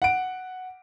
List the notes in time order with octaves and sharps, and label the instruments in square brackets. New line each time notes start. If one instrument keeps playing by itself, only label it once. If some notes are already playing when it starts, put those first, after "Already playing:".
[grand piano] F#5 D7